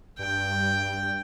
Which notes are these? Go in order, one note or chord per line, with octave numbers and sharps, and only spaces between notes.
G2 G5